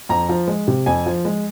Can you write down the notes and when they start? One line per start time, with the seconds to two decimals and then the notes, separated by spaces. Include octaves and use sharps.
0.09 F2 A#5
0.29 F3
0.48 G#3
0.68 C3
0.86 F2 G#5
1.06 F3
1.25 G#3